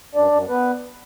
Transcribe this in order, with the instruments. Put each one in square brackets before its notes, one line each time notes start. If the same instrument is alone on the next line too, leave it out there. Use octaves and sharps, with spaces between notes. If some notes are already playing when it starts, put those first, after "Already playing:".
[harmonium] F#2 D4 D5
F#2
B3 B4